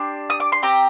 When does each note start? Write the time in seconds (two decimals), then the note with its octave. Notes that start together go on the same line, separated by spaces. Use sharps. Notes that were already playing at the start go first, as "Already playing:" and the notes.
Already playing: D4 G4 C6
0.30 D#6
0.40 D6
0.52 C6
0.62 C4 G4 G5 A#5